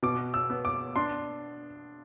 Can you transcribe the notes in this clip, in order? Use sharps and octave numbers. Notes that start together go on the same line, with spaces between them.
B2 D6
E6
B3
D6
D4 C6